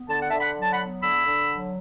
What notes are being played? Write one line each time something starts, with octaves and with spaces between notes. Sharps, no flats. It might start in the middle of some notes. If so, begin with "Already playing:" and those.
Already playing: B3
D3 A5
F#5
E5 A5
D3
F#5 B5
F#3 A5
F#5 B5
B3
D3 B5 E6
D3
F#3